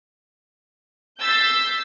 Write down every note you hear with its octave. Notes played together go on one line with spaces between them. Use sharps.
E6 G6 A6 B6 C7